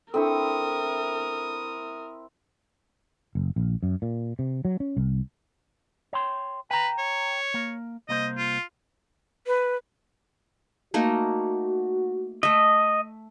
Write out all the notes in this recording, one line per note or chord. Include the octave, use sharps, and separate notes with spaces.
C4 D4 E4 A4 A#4 C#6 D#6
F#1
A#1
F#2
A#2
C3
F#3
C#4
C2
C#5 G5 C6
B4 G5 A#5
C#5
A#3
C2 A#3 C5 D#5
F4
B4
A3 A#3 D#4 F#4
A3 D#5 E5